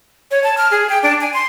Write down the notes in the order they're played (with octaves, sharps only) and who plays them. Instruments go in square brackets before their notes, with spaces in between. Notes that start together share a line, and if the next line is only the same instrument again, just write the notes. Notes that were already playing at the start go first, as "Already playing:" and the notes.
[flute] C#5
A5
F6
G#4
G5
D4
G#5
C6